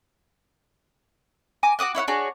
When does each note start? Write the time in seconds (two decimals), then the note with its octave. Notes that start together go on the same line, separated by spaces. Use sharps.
1.63 G#5 A#5 D6
1.79 F#4 D6 D#6 F#6
1.95 E4 C#5 E5 F#5
2.08 D4 F#4 G#4 C#5